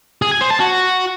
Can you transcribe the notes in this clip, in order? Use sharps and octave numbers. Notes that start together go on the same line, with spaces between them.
G#4
G#5
C5
A5
F#4